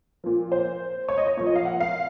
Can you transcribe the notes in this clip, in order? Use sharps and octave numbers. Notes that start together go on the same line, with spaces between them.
A#2 F3
C5
C#5
D#5
C#5
A#2 F3 C#5
D#5
F5
F#5
F5